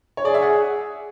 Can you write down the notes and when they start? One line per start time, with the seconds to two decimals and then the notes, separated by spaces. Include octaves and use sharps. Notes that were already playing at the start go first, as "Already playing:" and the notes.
0.17 C#5
0.25 G#4 D5
0.34 E5
0.43 F#5